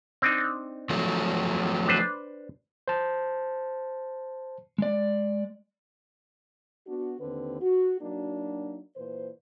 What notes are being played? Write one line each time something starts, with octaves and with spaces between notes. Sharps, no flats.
C4 D4 D#4
F3 F#3 A3
D4 B4 C5
C5 A5
G#3 D5
B3 D4 F#4
D#2 D3 C4 B4
F#4
F#3 A#3 D4 D#4 F#4
A#2 E3 B4 C5